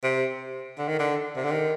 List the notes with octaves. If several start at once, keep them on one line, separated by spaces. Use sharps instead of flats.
C3
D3
D#3
D3
C3
D3
D#3